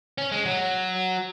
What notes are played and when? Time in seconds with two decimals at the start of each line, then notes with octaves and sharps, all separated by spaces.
0.18 C#4
0.32 G#3
0.46 F#3